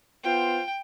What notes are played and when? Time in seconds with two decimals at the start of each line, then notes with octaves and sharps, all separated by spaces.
0.24 B3 F4 C5 G5